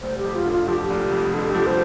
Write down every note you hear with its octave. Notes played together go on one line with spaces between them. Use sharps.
F1 C5
G4
F2
F4
D3
F4
F3 G4
F1
F2
D3 A4
F3 G4
C5